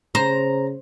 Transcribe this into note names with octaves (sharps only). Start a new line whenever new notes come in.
C#3 C5 A#5